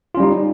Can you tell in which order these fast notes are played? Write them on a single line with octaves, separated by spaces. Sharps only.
F4 C#4 G3 D#4